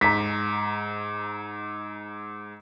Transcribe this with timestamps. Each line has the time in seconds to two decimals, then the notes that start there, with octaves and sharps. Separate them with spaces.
0.01 G#2 A#5 B6